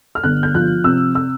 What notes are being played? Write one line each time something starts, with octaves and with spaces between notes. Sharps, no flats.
F6
G1 F#6
G6
F3 F#6
C3 E6
E6